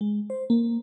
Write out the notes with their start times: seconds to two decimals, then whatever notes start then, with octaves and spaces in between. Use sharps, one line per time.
0.01 G#3
0.30 C5
0.50 A#3